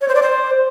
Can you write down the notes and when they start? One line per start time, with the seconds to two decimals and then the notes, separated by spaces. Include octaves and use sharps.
0.01 C#5
0.08 C5
0.15 D5
0.22 C5